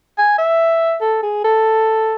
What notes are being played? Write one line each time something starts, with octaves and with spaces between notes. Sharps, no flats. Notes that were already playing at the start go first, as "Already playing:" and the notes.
G#5
E5
A4
G#4
A4